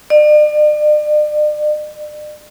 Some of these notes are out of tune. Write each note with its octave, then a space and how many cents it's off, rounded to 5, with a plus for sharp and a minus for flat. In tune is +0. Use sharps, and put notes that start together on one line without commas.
D5 +40